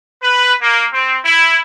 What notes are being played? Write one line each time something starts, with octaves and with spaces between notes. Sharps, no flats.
B4
A#3
C4
E4